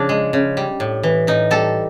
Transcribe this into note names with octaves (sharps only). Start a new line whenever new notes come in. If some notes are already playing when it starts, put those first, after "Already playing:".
Already playing: C#3 F3 D4
G#3
C#3
G3
A2
E3
A2 D#4
G3 A4